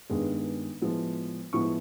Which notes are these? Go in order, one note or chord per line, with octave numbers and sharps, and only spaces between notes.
G2 D#3 G#3 B3
A2 F3 G#3 B3
A2 F3 G#3 B3 C#6